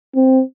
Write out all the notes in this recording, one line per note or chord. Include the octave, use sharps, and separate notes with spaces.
C4